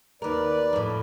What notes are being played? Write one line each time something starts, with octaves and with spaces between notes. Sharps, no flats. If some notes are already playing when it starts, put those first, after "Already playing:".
D#2 A#4 B4 D5
F2 A2